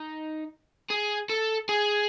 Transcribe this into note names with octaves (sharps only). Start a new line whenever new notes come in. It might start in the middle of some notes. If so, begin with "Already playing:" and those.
Already playing: D#4
G#4
A4
G#4